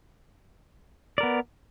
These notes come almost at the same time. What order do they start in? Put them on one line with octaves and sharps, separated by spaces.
D5 A#4 B3